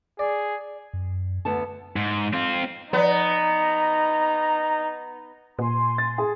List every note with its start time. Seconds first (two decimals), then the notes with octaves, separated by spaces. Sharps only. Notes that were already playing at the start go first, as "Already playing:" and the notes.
0.19 G#4 D5
0.93 F#2
1.45 D2 B3 A5
1.96 G#2
2.34 C4 F4
2.93 F3 B3 D#4 D5 A#5
5.59 A#2 G#5 C6
5.98 A6
6.18 G#4